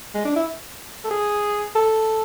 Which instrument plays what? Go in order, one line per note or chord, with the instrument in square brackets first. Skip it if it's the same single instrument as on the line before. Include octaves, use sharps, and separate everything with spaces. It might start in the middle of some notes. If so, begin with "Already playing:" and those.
[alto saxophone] G#3
D4
E4
A4
G#4
A4